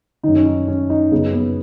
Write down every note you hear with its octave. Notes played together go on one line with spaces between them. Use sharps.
F#2 D#3 D#4
C#4
D#4
C#4
D#4
F#2 C#3 B3
B3